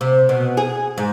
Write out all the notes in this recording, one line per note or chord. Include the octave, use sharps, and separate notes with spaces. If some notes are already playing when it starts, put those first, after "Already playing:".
C3
B2
G#4
G#2